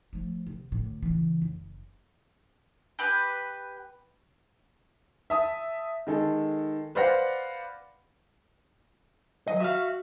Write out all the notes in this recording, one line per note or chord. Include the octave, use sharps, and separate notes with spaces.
F3 A3
C3
A2 D3
C#3 E3
F#1
G4 B4
E5 A5 D#6
D#3 G#3 A4
B4 C5 D5 F5 F#5 A#6
D#3 F#3 D#5
F#4 E5 F5